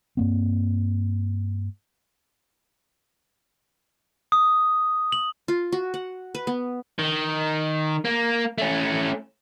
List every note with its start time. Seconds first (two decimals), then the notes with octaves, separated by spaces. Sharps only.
0.17 G2 A#3 C4
4.32 D#6
5.12 F#7
5.48 F4
5.72 F#4
5.94 F#5
6.35 B4
6.47 B3
6.99 D#3
8.05 A#3
8.58 A3 C#4